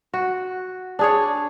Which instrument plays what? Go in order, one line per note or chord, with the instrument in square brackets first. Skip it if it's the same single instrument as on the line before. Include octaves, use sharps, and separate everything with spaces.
[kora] F#4
D4 G#4 C#5